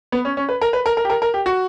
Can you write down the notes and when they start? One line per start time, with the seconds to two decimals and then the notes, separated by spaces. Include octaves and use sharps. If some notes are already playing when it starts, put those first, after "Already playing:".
0.12 B3
0.25 C#4
0.37 C#4
0.49 B4
0.61 A#4
0.73 B4
0.86 A#4
0.97 A#4
1.05 G4
1.10 A#4
1.22 A#4
1.34 G4
1.46 F#4